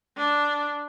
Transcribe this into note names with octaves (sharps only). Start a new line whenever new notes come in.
D4